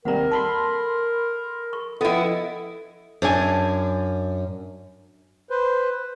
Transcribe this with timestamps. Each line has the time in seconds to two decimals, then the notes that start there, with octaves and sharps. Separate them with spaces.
0.05 D#2 C3 G3 A#4 F#5 A#5
0.31 A4 A5 B5 C6
1.73 C#6
2.01 F3 B3 E4 A4 D#5 G5
3.22 F#2 D4 G#5
5.50 B4 C5